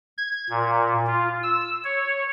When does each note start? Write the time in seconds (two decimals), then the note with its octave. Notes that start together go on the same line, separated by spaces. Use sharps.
0.18 G#6
0.50 A#2
1.07 F4
1.43 E6
1.84 C#5